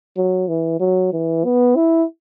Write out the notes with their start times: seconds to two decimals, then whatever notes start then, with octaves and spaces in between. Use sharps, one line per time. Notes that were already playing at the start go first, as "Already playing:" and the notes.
0.17 F#3
0.48 E3
0.80 F#3
1.13 E3
1.44 B3
1.76 E4